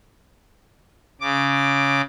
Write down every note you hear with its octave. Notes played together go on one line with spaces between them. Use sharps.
C#3 D6